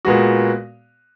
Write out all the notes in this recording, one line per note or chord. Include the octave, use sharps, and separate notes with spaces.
A#2 G#3 B3 F#4